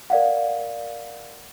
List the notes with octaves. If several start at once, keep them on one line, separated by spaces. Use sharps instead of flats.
A#4 D5 F5 F#5